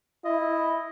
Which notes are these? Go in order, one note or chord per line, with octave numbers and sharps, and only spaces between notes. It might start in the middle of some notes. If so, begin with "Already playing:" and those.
E4 D#5